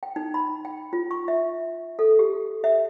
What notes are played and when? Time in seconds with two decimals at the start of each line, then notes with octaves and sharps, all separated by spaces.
0.03 G5
0.16 D#4
0.34 B5
0.65 G5
0.93 F4
1.11 C#6
1.28 E5
1.99 A4
2.19 G4
2.64 E5